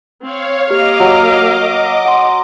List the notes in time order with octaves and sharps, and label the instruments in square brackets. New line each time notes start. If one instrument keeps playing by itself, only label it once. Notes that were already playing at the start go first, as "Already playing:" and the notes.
[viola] C4 [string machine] C#5 F5
[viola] A#3 F5 [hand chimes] G4 [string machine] D#5 D6
[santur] F#3 [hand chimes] E6
[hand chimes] F#5 C6